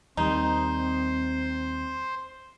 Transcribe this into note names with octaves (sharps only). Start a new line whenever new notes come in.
D#2 D#3 G3 C4 D#4 C5